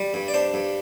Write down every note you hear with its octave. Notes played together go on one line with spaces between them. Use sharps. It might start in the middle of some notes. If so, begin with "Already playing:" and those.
Already playing: G3
G2
D5
D4 C5
G2